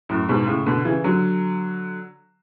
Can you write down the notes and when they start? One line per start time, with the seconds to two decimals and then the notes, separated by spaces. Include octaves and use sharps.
0.09 F#2 A2
0.29 G#2 B2
0.47 A2 C#3
0.66 B2 D3
0.85 C#3 E3
1.04 D3 F#3